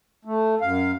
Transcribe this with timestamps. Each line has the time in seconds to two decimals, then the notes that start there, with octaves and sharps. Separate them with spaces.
0.25 A3
0.61 F#2 F5